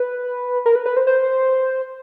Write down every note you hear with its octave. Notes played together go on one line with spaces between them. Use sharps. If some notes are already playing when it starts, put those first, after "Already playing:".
Already playing: B4
A#4
B4
B4
C5
C5